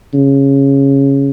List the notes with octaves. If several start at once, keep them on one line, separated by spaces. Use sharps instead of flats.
C#3